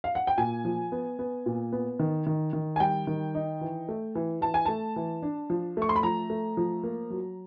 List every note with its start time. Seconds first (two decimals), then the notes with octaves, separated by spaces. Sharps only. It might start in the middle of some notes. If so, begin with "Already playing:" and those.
0.04 F5
0.15 F#5
0.27 G5
0.38 A#2 G#5
0.65 F3
0.92 B3
1.19 B3
1.46 A#2
1.72 B3
1.99 D#3
2.26 D#3
2.53 D#3
2.76 G#5
2.80 G3 G5
3.07 D#3
3.35 D#4
3.61 E3
3.89 A3
4.15 E3
4.41 E3 A5
4.54 G#5
4.65 A3 A5
4.96 E3
5.23 D4
5.50 F3
5.77 A3 C#6
5.89 C6
5.96 B5
6.03 F3 A#5
6.30 A3
6.57 F3
6.84 A#3
7.10 F#3